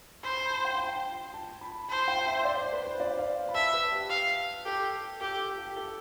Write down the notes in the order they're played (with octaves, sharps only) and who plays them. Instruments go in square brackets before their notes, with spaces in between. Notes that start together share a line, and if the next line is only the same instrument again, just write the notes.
[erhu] C5 [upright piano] B5
[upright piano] B5
A5
G5
G5
A5
B5
[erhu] C5 [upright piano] A5
[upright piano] G5
E5
D5
C5
B4
C5
D5
F5
B5
[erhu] E5 [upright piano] A5
[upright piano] B4
G4
[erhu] F5
[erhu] G4 [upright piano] A4
[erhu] G4 [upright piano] A4
[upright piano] G4
G4
A4